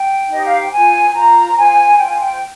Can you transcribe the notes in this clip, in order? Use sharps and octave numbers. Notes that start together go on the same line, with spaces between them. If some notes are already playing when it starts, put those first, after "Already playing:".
Already playing: G5
D#4 G4 C5 D#5
F5
G5
F4 C5 G#5
F4 C5 A#5
F4 C5 G#5
F4 C5 G5
G#5
G5